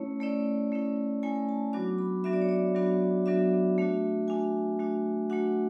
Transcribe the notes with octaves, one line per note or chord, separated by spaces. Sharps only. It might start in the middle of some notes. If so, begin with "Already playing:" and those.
Already playing: A3 C#4 E4 C#5
A3 C#4 E4 D5
A3 C#4 E4
A3 C#4 E4 G#5
A5
F#3 B3 D4 F#4 D6
B5
F#3 B3 D4 F#4 E5
D5
C#5
D5
F#3 B3 D4 F#4
F#3 B3 D4 F#4 E5
A3 D4 F#4
A3 D4 F#4 G#5
A3 D4 F#4
A3 D4 F#4 F#5